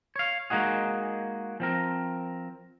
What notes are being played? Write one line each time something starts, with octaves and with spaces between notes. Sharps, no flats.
C#5 F5
G#3 A#3 D#4 F#4 G#4
F3 C4 A#4